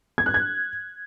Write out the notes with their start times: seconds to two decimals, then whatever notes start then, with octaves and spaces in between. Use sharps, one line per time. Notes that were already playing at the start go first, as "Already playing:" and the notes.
0.18 G#6
0.26 F#6
0.34 G#6